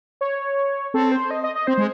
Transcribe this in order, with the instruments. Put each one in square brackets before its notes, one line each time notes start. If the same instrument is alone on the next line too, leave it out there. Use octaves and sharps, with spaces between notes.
[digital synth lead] C#5
[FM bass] C4 [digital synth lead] A4
[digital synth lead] C5
D#5
D#5
D#5
[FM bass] C4 [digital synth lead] C5
[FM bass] G#3